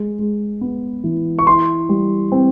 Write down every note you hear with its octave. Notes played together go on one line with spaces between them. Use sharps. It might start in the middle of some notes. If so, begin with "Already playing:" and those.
Already playing: G#3
G#3
B3
E3
C#6
E4 C6
G3
C4